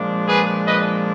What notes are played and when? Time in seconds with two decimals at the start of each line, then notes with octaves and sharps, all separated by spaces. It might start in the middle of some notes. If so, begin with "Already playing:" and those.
Already playing: A#2 F3 G#3 D4
0.27 G#4 B4
0.66 B4 D#5